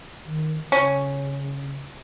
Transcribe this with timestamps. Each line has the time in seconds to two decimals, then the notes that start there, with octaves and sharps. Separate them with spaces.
0.25 D#3
0.72 C#3 C#4